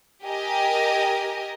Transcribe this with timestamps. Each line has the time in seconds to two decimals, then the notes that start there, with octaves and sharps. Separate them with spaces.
0.23 G4 A#4 D#5 G#5